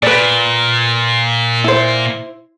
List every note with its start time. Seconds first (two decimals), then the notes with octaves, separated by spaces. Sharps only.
0.03 A#2 B4 D5
1.64 E4 C5